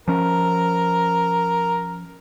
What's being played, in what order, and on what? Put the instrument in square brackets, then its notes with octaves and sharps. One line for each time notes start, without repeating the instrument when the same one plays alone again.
[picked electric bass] F3 C#4 [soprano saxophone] A#4